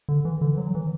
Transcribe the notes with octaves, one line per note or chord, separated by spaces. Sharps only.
D3
E3
D3
E3
F#3
E3